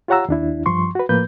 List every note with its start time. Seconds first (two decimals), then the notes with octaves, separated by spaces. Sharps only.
0.08 F4 G4 C#5 F#5 A#5 E6
0.29 D#2 D4 E4
0.66 G2 F3 C6 C#6
0.95 F#4 B4
1.09 A2 F3 A#3 B4 G6